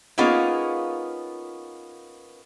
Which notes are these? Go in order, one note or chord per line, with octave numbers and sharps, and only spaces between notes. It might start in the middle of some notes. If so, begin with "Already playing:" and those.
A#3 B3 C#4 D#4 F4 G#4